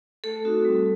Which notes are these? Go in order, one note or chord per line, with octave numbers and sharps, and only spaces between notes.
A3 A4
C4 D#4 F#4
G3